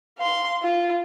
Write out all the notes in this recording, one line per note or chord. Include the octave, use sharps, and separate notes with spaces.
F5 C6
F4